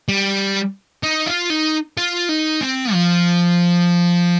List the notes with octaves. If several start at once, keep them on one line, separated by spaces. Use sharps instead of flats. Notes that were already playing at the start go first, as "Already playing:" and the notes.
G3
D#4
F4
D#4
F4
D#4
C4
F3